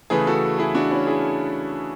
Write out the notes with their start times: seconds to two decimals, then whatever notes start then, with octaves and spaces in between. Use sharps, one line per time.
0.10 C#3 E3 A3 G#4 B4
0.27 F#4 A4
0.58 E4 G#4
0.74 D4 F#4
0.91 C#4 E4
1.07 E4 G#4